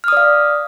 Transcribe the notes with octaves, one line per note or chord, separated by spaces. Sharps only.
D5 F5 D#6 F6